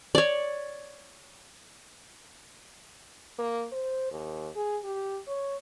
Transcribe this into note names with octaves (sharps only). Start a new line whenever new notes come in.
C#5 D5
A#3
C5
D#2
G#4
G4
C#5